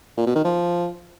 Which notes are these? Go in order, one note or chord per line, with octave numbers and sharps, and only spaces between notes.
A#2
B2
D#3
F3